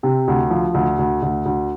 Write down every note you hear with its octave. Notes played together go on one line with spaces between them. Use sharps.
C3
D2
F3
D2
D2
D2
D2